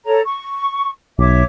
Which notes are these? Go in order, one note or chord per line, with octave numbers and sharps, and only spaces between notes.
A4 C#5 A#5
C#6
B1 C#5 E5 D6